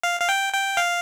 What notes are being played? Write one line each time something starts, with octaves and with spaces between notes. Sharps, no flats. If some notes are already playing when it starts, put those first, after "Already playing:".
F5
F5
G5
G5
F5